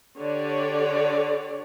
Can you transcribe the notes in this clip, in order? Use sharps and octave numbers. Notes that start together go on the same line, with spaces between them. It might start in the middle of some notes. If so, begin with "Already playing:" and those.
D3 G4 C#5 D5